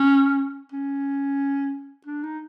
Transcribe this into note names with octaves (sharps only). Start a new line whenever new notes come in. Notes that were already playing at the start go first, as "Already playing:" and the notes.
Already playing: C#4
C#4
D4
D#4